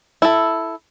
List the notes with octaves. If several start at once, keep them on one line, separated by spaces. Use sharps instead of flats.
E4 A4